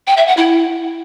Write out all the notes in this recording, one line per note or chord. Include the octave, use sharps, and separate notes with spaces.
G5
E5
F#5
E4